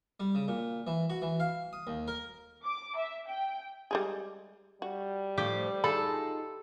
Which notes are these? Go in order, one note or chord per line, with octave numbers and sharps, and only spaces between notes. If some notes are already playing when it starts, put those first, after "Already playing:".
G3
C#3
A#2
E3
F#4
E3
F5
D#6
D#2
A#4
D6
E5
G5
G3 G#3 G#4
G3 F#4
A2 F3 G4
D#4 F4 G#4 A4 B5